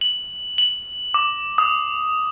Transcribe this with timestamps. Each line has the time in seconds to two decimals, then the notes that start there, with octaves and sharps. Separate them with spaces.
0.01 F#7
0.58 F#7
1.14 D6
1.58 D#6